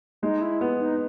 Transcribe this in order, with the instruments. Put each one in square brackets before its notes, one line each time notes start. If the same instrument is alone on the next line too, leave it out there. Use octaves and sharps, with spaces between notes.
[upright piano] G#3 [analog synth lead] D#4
[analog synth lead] E4
[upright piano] B3
[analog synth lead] D#4